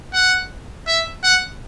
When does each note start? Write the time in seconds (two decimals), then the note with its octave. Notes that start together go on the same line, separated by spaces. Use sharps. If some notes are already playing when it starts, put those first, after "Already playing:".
0.13 F#5
0.87 E5
1.23 F#5